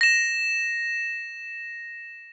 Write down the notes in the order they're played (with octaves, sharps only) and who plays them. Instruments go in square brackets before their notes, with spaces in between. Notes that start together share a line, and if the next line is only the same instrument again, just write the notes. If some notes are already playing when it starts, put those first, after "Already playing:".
[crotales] A#6 E7